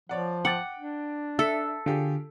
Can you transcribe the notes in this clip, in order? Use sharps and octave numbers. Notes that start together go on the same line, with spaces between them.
F3 C#5 D5 F#5
F#5 G5 D6 A6
D4
A4 E5 B6
D3 F4 G4 G#4